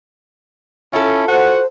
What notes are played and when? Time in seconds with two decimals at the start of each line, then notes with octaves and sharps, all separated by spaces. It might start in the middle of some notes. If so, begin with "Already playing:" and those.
0.93 C#4 E4 F4 A4
1.28 F#4 C5 F#5